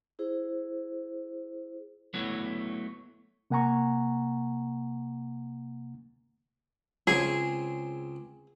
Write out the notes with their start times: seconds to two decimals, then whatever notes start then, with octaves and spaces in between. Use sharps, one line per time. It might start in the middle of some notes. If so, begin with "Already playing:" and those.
0.19 E4 G#4 C5
2.14 F#3 A3 B3 E4
3.50 C3 A#3 F#5 G#5 A#5 C#6
7.07 C#2 C4 G#4 C#5